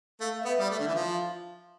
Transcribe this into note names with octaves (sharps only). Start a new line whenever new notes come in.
A3 F5
E5
B3
G3 D5
A3
D3 E5
E3
F3 F5